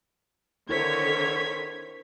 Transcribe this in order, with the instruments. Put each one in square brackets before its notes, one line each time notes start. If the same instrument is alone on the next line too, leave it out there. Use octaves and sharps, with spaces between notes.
[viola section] D3 D#3 C#5 [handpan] E4 A#4 C5 [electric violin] G#6 B6